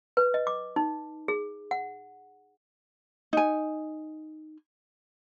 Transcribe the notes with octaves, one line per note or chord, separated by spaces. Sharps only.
B4
D#5
D6
D#4
G#4
F#5
D#4 G#5